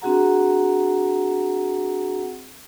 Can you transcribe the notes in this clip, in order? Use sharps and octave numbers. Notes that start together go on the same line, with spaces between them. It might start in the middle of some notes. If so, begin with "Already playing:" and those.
C4 D4 F#4 G#4 F#5 A#5